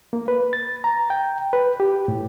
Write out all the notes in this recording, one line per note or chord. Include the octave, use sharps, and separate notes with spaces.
A#3
B4
A6
A#5
G5
B4
G4
A2